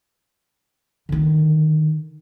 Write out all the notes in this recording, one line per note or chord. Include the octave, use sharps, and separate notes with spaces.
D3 D#3